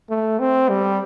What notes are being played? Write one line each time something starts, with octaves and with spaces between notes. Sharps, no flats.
A3
C4
G3